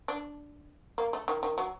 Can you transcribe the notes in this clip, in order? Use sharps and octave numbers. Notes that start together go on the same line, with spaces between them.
D4
A#3
A3
D#3
D#3
F#3